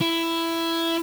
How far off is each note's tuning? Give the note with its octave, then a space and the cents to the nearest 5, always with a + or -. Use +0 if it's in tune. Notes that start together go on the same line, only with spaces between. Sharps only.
E4 +10